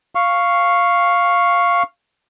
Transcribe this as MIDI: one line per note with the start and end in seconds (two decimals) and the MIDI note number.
0.15 1.83 77
0.15 1.83 85